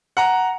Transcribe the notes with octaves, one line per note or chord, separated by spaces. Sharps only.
F#5 A#5